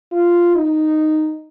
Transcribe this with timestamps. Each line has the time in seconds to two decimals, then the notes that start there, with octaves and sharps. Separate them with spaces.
0.12 F4
0.55 D#4